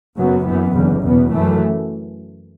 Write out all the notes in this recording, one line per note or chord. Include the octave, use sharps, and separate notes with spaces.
F#1 F#2 F#3 B3
F#2 E3 B3
F#1 E2 D3
E2 B2 B3
F#2 E3 A3